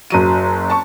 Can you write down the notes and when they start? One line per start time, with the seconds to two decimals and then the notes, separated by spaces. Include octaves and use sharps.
0.10 F#1 F#3 D#7
0.70 A5 C#6